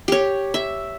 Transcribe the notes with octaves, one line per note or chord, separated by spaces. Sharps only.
G4 C#5
E5